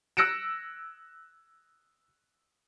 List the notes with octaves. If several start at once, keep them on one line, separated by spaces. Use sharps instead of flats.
E6 F#6 A#6 C#7 D7 E7